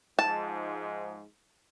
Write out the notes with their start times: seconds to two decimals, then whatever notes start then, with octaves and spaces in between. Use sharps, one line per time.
0.19 G#2 F3 A5